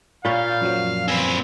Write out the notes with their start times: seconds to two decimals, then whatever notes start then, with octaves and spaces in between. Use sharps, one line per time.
0.25 A#2 C#5 F5 B5 G6 A6
0.61 F#2 F3 F#3
1.08 C4 B4 G#5